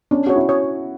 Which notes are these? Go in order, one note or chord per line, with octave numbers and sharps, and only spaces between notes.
C#4 D4
F#4 C#5
E4
C#5